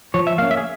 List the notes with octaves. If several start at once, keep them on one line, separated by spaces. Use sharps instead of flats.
F3 C#5
E5
A#3 C#4 F5
E5
G#4